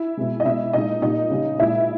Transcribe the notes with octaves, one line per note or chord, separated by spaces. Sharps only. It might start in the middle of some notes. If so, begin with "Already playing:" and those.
Already playing: E4 E5
B2 G#3
D#5
B2 G#3 E4 E5
A#2 G#3 D#4 D#5
A#2 G3 D#4 D#5
C#3 G3
A#2 G#3 E4 E5